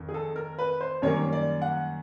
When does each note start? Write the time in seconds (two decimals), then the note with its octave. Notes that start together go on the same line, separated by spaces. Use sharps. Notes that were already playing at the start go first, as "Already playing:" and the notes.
Already playing: F2 D#3
0.09 G#4
0.14 A4
0.36 A#4
0.59 B4
0.81 C5
1.02 F#2 D#3 G3 A#3 C#5
1.33 D5
1.62 F#5